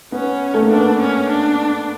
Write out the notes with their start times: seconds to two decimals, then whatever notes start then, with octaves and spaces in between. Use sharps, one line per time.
0.12 B3 C#4
0.54 A3
0.63 A#3
0.72 B3 D4
1.00 C#4
1.30 D4